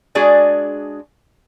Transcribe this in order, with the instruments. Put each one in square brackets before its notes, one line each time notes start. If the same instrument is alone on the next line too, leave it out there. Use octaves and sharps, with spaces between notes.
[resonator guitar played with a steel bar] G#3 D4 F#4 G#4 D5